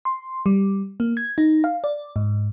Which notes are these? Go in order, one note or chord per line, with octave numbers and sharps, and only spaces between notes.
C6
G3
A#3
G#6
D#4
F5
D5
G#2